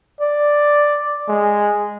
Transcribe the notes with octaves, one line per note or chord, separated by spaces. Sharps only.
D5
G#3